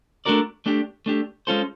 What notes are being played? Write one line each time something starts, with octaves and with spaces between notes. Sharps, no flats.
A3 D4 F#4 A#4 D5
A3 D4 G4
A3 D4 G4
G#3 C#4 F4 A4 C5